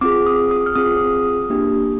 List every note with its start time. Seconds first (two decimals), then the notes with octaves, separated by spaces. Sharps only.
0.01 C4 F4 G#4 D6
0.26 D#6
0.51 D#6
0.66 F6
0.76 C4 F4 G#4 D#6
1.50 A#3 D4 G4